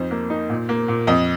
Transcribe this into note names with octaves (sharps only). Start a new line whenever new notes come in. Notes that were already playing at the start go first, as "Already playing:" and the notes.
Already playing: F2 D#4 C5
A#3
D#4
A#2
A#3
A#2
F2 D#5